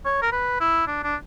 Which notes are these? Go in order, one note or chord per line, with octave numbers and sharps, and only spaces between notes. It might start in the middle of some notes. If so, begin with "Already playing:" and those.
C#5
A#4
B4
E4
D4
D4